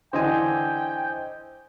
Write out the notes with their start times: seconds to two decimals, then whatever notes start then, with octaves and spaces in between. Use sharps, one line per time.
0.13 D3 E3 C5 D#5 G5 G#5